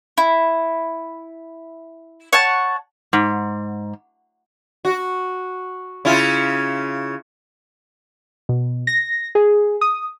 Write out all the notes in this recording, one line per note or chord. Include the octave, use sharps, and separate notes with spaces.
E4
C#5 F#5 A5
G#2
F#4
C#3 E4 F4
B2
A#6
G#4
D#6